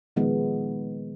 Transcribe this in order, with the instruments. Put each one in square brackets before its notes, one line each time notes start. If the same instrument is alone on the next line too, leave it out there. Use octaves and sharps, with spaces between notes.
[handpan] A#2 D#3 F3 G#3 B3